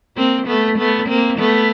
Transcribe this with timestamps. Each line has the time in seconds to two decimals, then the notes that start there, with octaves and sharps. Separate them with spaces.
0.16 A#3 C4
0.47 A3 B3
0.78 A3 B3
1.08 A#3 C4
1.39 A3 B3